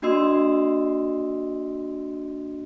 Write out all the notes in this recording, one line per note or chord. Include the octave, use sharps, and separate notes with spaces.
A#3 D4 F#4 D#5 C6 E6